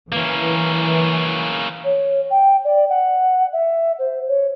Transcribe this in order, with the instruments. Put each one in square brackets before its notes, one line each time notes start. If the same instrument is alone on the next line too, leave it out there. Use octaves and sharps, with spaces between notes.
[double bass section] E3 [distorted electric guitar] A#3 C#4
[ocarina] C#5
G5
D5
F#5
E5
C5
C#5